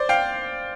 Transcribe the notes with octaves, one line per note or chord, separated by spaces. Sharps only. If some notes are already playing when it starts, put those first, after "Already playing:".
Already playing: C5 D5
F5 G5